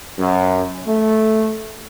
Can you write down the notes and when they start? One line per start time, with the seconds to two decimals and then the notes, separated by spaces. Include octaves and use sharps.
0.19 F#2
0.86 A3